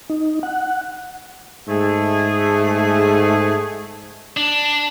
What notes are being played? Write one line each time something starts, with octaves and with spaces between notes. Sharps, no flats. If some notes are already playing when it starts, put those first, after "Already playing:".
D#4
F#5
G#2 A3 G#4
D4